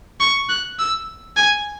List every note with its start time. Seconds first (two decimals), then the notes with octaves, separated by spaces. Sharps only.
0.20 C#6
0.49 F#6
0.79 E6
1.36 G#5